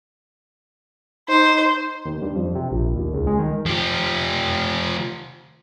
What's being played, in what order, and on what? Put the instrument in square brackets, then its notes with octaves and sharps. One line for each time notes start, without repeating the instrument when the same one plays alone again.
[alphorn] D#4 [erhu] C5
[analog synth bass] D#2
G2
F2
C3
A#1
D#2
C#2
G#3
D#3
[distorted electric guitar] F3 G4